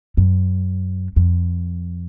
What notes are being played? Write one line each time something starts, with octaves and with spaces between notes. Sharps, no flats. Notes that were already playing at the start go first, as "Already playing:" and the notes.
F#2
F2